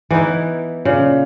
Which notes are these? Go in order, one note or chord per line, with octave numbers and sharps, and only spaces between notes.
E3 B3 D#4 E4
A#2 C#3